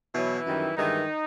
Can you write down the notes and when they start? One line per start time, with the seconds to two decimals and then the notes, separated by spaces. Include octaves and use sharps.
0.14 B2 E3 F#3 E4
0.45 F#2 D#3 G3
0.77 G2 D#3 E3 G#3 D#4